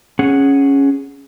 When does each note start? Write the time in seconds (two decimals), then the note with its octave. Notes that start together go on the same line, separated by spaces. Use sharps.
0.19 C#4 G#4 F#5